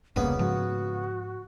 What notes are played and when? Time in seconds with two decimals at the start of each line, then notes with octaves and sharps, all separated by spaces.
0.16 E1 C2 G2 C#3 A#3 B3 B5
0.39 G#2 F3 G#3 F#4